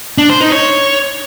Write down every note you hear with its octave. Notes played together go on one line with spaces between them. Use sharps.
D4
C5
D#4
C#5